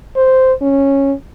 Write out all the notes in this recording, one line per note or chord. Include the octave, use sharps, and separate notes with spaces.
C5
C#4